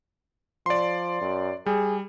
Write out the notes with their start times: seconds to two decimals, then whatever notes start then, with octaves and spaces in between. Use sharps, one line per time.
0.66 F3 D5 C6
1.21 F#2
1.66 G3 G#4